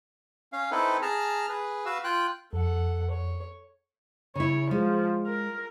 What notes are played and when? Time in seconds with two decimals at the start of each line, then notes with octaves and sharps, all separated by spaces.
0.53 C#4 F5
0.71 C4 D#4 E4 A4 B4
1.02 G#4 A5 A#5 F6
1.49 G#4 B4
1.86 F#4 B4 F5 E6
2.04 F4 G5 F#6
2.53 F2 A4 F#5
3.10 C#5
4.36 C#3 E4 C#5
4.71 F3 G#3
5.27 A#4